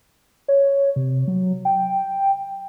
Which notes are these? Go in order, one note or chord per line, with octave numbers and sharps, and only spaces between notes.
C#5
C3
F#3
G5